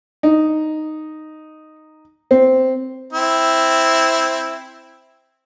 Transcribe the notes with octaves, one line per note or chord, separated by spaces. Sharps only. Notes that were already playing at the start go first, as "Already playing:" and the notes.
D#4
C4
C4 E4